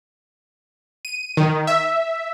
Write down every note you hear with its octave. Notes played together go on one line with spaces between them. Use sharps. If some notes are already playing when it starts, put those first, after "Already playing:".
D#7
D#3
E5